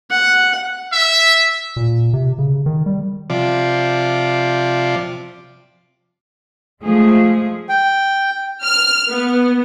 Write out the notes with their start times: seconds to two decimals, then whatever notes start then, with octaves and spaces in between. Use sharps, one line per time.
0.10 F#5
0.93 E5
1.76 A#2
2.13 C3
2.38 C#3
2.66 D#3
2.86 G3
3.30 C3 F3 D5
6.83 F3 G#3 A3 G#4
7.69 G5
8.64 F6
9.11 B3